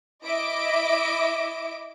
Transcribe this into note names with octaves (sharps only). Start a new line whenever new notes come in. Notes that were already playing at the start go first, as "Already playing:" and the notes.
E4 D#5 E5 D6 D7